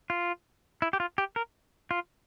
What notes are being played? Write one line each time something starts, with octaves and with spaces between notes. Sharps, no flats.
F4
E4
G4
F4
G4
A#4
F4